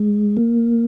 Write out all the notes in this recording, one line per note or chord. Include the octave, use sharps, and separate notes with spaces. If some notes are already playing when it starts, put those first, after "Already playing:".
Already playing: G#3
A#3